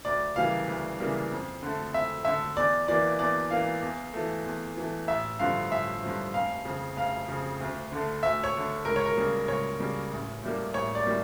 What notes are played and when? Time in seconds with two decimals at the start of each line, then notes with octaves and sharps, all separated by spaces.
0.05 D2 D5
0.36 C#3 E3 G3 A#3 F5
0.67 D2
1.00 C#3 E3 G3 A#3
1.31 F2
1.63 D3 A3
1.93 F2 E5
2.25 D3 A3 E5
2.57 E2 D5
2.88 E3 A#3 D5
3.19 E2 D5
3.51 E3 A#3 F5
3.83 E2
4.14 E3 A3
4.46 E2
4.77 E3 A3
5.08 A1 E5
5.39 G2 D3 F3 F5
5.71 A1 E5
6.03 G2 D3 F3
6.34 F1 F5
6.65 F2 C#3
6.96 F1 F5
7.28 F2 C#3
7.60 D2
7.92 D3 A3
8.23 D2 E5
8.44 C#5
8.54 D3 A3
8.85 C#2 A#4
8.96 C#5
9.05 A#4
9.17 C#3 G3 A#3
9.48 C#2 C#5
9.80 C#3 G3 A#3
10.11 A1
10.43 A2 G3 A#3
10.74 A1 C#5
10.95 D5
11.05 A2 G3 A#3